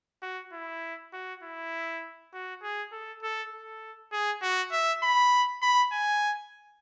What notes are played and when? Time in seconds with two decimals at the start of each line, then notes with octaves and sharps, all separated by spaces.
0.22 F#4
0.53 E4
1.13 F#4
1.44 E4
2.33 F#4
2.63 G#4
2.92 A4
3.23 A4
3.53 A4
4.13 G#4
4.42 F#4
4.72 E5
5.03 B5
5.62 B5
5.92 G#5